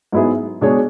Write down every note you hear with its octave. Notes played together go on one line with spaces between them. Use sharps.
G#2 F#3 B3 E4 G#4
B2 G#3 D4 G#4 C#5